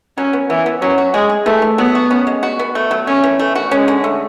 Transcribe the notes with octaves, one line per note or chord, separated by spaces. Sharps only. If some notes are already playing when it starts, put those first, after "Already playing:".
F#3 C#4
B3
E3 B3
B3
F#3 C#4
F#4
G#3 G#4
G#4
E3 A3
E3
F#3 B3
F#4
C#4
G#3
F#4
B3
A3
F#3
A3 C#4
E3
A3
F#4
G#3 C#4
D3
A3